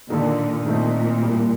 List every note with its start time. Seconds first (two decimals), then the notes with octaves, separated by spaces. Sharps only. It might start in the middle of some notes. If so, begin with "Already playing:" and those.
0.10 A#2 D3 D#3 A#3 F4 A4
0.66 A#2 D#3 A3 C4 D#4
1.22 A2 G3 A#3